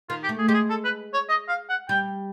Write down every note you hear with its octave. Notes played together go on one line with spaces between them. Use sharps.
D#3 F4
G4
A3
G#4
G#3 G4
G#4
A4
B4
C#5
D#5
F5
F#5
G3 G5